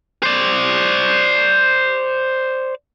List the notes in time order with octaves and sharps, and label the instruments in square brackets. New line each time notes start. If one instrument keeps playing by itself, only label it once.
[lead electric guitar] C5 D5